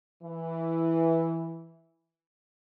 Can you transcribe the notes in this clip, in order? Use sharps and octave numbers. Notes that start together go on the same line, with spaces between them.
E3